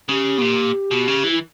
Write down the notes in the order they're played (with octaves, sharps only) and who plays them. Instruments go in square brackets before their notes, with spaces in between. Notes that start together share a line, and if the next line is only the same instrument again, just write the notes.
[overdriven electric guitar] C#3 [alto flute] G4
[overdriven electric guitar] B2
A#2
B2
C#3
E3
[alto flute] E4